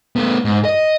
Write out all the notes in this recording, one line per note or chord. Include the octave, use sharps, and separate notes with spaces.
A3 B3
G#2
D#5